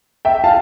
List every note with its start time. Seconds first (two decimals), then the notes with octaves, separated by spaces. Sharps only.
0.25 E5 G5
0.44 F5 A5